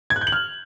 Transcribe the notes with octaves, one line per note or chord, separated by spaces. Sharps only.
G#6
F#6
G6
F#7
F6